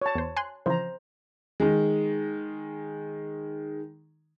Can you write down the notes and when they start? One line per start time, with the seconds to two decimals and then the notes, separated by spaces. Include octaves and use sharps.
0.02 C#5 A5
0.15 E2 C5
0.37 G#5 C6 F#6
0.66 C#3 E3 F3 C5 A#5
1.60 D#3 G#3